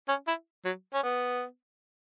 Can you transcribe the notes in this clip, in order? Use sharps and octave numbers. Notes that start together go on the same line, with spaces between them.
C#4
E4
F#3
C#4
B3